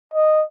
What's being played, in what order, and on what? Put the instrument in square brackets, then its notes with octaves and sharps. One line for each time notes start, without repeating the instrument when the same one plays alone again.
[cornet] D#5